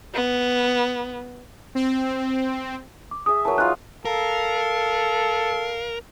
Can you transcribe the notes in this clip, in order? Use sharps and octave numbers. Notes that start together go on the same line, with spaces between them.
B3
C4
D6
G#4 E5 D#6
E3 F#3 A#4 A5
D#4 F4 F#6
A4 A#4 F5